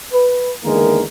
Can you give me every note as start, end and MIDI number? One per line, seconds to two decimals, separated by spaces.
0.12 0.52 71
0.64 1.02 40
0.64 1.02 50
0.64 1.02 51
0.64 1.02 56
0.64 1.02 58
0.64 1.02 70